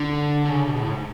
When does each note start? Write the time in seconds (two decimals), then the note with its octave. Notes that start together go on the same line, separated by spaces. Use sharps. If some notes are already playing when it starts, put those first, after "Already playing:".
Already playing: D3
0.45 D3
0.49 C#3
0.68 B2
0.80 A2
0.88 G#2